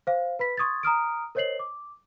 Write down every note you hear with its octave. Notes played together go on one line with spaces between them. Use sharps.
C5 F5
B4 B5 B6
C6 C#6 D#6 G#6 A6
A#5 D#6 F6 D7
A#4 C5 C#5 D#5 C7 F#7
D6